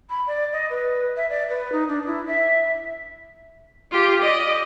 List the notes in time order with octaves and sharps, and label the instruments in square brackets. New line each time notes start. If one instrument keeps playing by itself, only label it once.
[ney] B5
D5
D#5
B4
E5
D5
B4
D#4
D4
E4
E5
[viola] F4 G4
D5 D#5